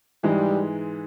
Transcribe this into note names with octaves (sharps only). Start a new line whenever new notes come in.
G#2 E3 G3 G#3